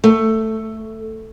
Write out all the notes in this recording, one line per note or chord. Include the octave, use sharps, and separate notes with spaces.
A3